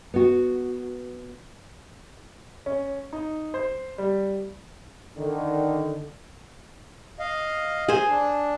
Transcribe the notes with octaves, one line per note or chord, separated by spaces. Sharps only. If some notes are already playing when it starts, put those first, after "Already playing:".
B3 F#4
C#4
D#4
C5
G3
D3 D#3
D#5 F5
G#4 C5
D4